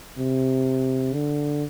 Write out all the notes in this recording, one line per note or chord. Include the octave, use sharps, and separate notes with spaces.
C3
D3